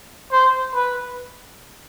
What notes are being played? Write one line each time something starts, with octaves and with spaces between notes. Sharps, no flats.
C5
B4